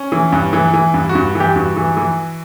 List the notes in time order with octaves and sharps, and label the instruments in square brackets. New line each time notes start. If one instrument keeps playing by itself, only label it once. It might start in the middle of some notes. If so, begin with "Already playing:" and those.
Already playing: [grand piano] C#4
E3
G2
E3
E3
G2
F#4
G2
E3
G4
G2 F#4
E3
E3